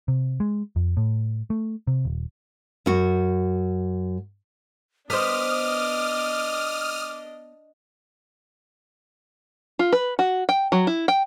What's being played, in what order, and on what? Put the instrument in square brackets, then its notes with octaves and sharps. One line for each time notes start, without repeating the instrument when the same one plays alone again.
[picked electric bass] C3
G#3
F2
A2
A3
C3
D#1
[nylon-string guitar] F#2 F#4
[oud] B3 C5 [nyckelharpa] D4 D#5 [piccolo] D6 [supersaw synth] D#6 F6
[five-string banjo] F4
B4
F#4
G5
F#3
E4
G5